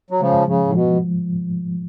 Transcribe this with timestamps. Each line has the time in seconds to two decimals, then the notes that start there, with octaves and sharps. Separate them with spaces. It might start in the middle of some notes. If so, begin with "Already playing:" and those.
0.11 F#3
0.20 C#3 F3 G#3
0.47 C#3 F3
0.67 A2
0.74 B2 F3